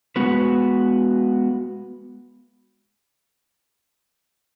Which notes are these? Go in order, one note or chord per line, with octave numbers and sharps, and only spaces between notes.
G#3 B3 F#4 B4